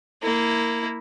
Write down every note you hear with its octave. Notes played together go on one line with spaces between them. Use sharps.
A#3 E4